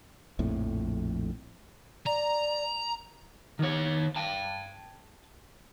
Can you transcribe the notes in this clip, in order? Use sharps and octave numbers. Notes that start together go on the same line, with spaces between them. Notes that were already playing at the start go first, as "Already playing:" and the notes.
A#1 F2 A2
D5 A#5
D#3 C#5
G5 A5